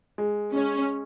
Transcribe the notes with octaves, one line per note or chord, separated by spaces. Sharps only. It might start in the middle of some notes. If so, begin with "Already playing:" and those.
G#3
G#3 C#4